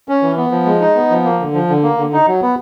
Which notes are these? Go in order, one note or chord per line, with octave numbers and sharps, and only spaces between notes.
C#4
E3
B3
F3
G#3
D#4
B3
F3
A#3
D3
F3
D3
A#3
D3
D#4
F#3
B3